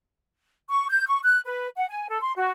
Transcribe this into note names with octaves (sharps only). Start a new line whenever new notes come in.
C#6
G6
C#6
F#6
B4
F#5
G#5
A4
C6
F#4